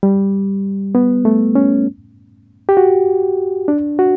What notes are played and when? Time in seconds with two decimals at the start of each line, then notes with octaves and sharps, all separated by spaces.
0.03 G3
0.95 B3
1.25 A3
1.55 C#4
2.69 G4
2.77 F#4
3.68 D4
3.99 F#4